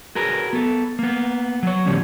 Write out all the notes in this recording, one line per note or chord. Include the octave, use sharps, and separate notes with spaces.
F#4 G#4 A#4 B4
B3 A4
A#3 B3
F#3 C#5
A2 D3 E3 F3 G3 C#4